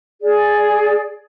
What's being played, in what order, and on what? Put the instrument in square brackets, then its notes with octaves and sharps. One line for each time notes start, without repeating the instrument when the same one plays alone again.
[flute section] G#4 D5